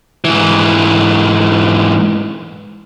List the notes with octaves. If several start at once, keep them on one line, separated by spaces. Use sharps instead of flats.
G#2 E3